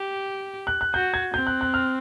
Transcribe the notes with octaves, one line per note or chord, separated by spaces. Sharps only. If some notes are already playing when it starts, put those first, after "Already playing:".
Already playing: G4
F#6
F#6
F#4 G6
G#6
C4 G6
F#6
F#6
F6